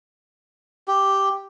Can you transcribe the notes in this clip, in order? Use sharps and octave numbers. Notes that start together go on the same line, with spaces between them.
G4